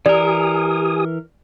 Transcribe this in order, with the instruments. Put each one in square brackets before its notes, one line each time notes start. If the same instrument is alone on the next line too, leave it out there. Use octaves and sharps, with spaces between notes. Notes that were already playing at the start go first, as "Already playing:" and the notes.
[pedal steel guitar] E3 A#4 [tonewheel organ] G4 G#5 D#6 [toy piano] D5